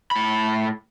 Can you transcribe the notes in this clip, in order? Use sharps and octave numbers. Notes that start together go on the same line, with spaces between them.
A2 B5